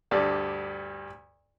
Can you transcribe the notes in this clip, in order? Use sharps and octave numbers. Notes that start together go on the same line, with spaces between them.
D2 G2 A4 D5